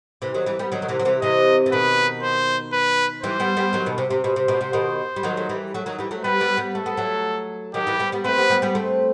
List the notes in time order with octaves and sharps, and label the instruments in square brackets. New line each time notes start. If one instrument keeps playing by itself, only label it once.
[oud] C3 E3
D#3 F#3
E3 G3
G3 B3
D#3 F#3
D#3
C3 E3
F#3
C3 E3
[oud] C3 E3 [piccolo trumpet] D#5
[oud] E3
[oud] B2 D#3 [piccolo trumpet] B4
[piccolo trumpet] C5
B4
[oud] E3 G3 [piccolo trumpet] C5
[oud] G3 B3
G3 B3
D#3 F#3
B2 D#3
C3
C3
[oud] B2 [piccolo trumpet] C5
[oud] C3
B2
C3
B2 D#3
G3
D#3 F#3
A3
E3 G3
F#3 A3
D#3 F#3
E3 G3
F#3 A3
[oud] G3 B3 [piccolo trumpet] B4
[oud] G3 B3
G3 B3
[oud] A3 [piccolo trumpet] A4
[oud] B3
F#3 A3
[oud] D#3 F#3 [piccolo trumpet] G4
[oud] E3 G3
G3 B3
G3 B3
[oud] A3 C4 [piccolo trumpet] B4
[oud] G3 B3
G3 B3
G3 B3
A3 C4